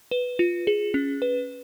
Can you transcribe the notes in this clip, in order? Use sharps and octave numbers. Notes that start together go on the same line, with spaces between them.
B4
F4
G#4
C#4
B4